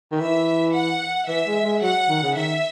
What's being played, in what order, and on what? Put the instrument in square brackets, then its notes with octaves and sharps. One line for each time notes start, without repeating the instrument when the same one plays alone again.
[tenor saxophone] D#3
[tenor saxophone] E3 [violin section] E5
[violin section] F#5
[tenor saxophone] E3 [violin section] E5
[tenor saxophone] G#3
G#3
[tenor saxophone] F#3 [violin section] F#5
[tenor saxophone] D#3
C#3
[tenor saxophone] D#3 [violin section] E5